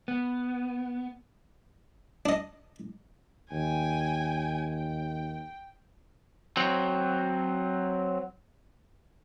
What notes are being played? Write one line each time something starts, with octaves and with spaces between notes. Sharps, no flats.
B3
D4 D#5
D#2 G5 G#5
G5
F#3 C4